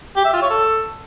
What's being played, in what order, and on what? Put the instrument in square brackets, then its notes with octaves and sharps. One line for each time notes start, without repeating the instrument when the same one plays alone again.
[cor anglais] G4
E5
F4
C#5
A4